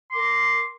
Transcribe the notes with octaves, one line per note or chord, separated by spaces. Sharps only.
A#4 C6 D6